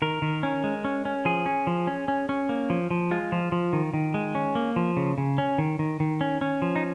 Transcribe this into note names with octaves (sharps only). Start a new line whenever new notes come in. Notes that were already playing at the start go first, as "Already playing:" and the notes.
D#3 A#4
D#3
C#4
G#3
C#4
C#4
F3 G#4
C#4
F3
C#4
C#4
C#4
A#3
F3
F3
G#3 F4
F3
F3
D#3
D#3
G#3
C#4
A#3
F3
C#3
C#3
C#4
D#3
D#3
D#3
C#4
C#4
F3
D#4